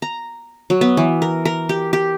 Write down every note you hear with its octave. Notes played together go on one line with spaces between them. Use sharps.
A#5
F#3
B3
E3
A#4
A#4
G4
G4